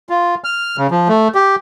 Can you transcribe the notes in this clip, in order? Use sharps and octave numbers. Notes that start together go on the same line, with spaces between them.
F4
F6
C#3
F3
A3
G4